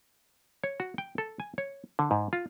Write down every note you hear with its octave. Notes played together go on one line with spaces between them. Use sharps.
C#5
F#4
G5
A4
G#5
C#5
D3
G#2
F4